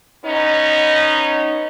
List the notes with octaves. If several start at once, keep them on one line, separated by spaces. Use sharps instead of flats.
B3 C#4 D#4